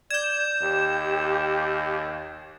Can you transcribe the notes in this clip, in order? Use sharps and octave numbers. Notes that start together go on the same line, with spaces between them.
D5 G6 G#6 E7
D#2 G4